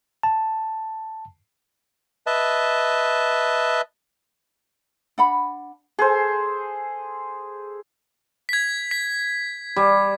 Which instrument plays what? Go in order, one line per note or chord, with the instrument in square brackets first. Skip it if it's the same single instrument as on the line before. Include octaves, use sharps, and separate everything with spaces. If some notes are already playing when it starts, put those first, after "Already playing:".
[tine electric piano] A5
[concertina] B4 D#5 E5 A5
[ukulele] D4 F#5 B5
[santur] G#4 A4 C5 [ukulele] B4
[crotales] G#6 B6
B6
[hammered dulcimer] G3